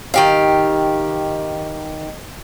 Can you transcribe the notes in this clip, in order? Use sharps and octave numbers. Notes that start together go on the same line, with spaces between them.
D#3 G4 F5